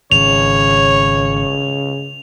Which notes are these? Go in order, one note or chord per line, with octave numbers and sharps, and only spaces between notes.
G#1 C#3 C#5 F7